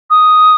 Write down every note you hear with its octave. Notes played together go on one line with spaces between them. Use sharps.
D#6